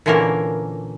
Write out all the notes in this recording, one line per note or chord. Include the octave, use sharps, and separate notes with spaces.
A#2 D3 E3 A#3 C#4 A#4